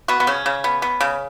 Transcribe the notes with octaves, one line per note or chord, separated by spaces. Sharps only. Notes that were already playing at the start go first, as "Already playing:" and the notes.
B3 F#4
B3
C#3 C#4
C#3
B3
B3
C#3